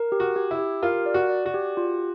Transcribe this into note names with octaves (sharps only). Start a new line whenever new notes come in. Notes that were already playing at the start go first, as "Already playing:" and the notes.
Already playing: A#4
G4
F#4
G4
E4
G4
F4 A#4
D5
F#4
D5
F#4
G4
F4